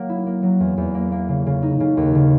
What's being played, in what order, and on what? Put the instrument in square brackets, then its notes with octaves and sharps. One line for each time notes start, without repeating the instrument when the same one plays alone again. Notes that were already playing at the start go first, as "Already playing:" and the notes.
Already playing: [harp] F#3 A#3
E4
A#3
F#3
E2
E2
A#3
A#3
C#3
C#3
D#4
C#3
D#2
C#3